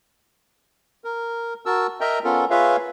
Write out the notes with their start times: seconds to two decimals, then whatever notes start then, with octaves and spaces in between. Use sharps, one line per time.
1.04 A#4
1.66 F#4 A#4 A5 E6
2.01 A#4 D#5 E5 G5 A#5
2.24 B3 C#4 F4 A4 A#4
2.50 F4 G#4 B4 C#5 E5 F5